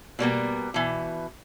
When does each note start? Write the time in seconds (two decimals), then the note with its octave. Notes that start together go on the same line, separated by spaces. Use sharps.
0.19 B2 G3 A#3 B3
0.74 B2 E3